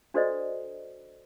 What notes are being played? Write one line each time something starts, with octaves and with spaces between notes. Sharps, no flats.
D4 F#4 A4 C5 D5 D#5